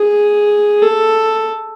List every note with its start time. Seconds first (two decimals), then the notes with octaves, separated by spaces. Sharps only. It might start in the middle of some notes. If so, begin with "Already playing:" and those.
Already playing: G#4
0.82 A4